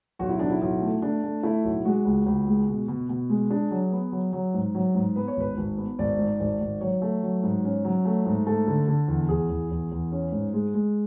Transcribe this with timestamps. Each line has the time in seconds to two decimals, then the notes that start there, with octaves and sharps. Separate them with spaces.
0.19 B1 F#4
0.29 E4
0.39 B1 D4
0.50 E4
0.61 B1
0.82 A3
1.02 A3 D4
1.23 A3
1.43 A3 E4
1.64 B1
1.85 G#3 F#4
2.05 C#2
2.26 C#2
2.48 G#3
2.68 B2
2.88 B2
3.09 B2
3.30 G#3
3.50 D4 G#4
3.71 F#3
3.92 B3
4.12 F#3
4.33 F#3
4.54 G#2
4.75 F#3
4.95 G#2
5.16 B3 B4
5.28 C#5
5.37 G#1 B4
5.57 G#1
5.78 B3
5.98 G#1 D5
6.19 G#2
6.40 G#1 D5
6.60 G#1
6.81 F#3 C#5
7.02 A3
7.23 F#3
7.43 G#2
7.64 C#4
7.85 F#3
8.05 A3
8.26 G#2
8.47 A3 A4
8.67 D3
8.88 D3
9.08 E2
9.29 E2 G#4
9.50 E2
9.71 E2
9.91 E2
10.12 C#4
10.32 G#2
10.53 G#3
10.74 G#3